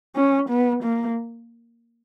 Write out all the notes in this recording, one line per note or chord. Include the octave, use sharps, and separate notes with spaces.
C#4
B3
A#3